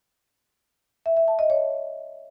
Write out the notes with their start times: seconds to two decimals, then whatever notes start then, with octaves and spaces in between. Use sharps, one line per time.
1.06 E5
1.17 E5
1.28 A5
1.39 D#5
1.50 C#5